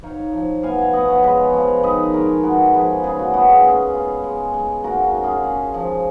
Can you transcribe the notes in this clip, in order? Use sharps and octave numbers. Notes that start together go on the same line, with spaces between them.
D#4 C#5 F5
F3
B3 F5 G#5
F5 G#5
B3 D#5 F#5
C#5 F5
G#3 B4 D#5
F3 C#5 F5
D#3 B4 D#5
G#3 A#4 C#5
B3 F#4 A#4
F3 G#4 B4
C#3 F4 G#4
F#4
B3 F#4
F4 G#4
C#4 F4 G#4
F4
G#3
G#3
F4 F#4 A#4
F#4
C#4
F4 G#4
C#4
F3